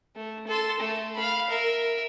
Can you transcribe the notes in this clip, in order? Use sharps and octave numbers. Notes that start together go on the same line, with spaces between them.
A3
A4 C6
A3
F5 B5
A#4 E5